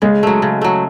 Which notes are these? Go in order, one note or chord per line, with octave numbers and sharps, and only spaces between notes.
C#3 G#3
F#3 A3
C#3
F#3 A3